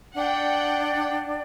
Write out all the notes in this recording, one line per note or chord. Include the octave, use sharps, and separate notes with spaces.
D4 D5 F#5 G5